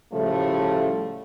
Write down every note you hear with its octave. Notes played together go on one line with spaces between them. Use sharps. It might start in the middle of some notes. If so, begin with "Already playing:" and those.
A2 C#3 F3 G3 A3